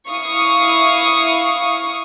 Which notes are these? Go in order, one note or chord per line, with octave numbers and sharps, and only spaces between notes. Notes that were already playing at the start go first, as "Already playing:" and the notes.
E4 F5 C#6 D#6